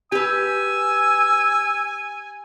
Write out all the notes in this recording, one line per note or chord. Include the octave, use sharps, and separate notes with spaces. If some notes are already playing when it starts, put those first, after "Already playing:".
G4 B4 G#5 E6